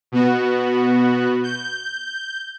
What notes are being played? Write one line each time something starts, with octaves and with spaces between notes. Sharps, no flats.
B2 B3 F#4
G6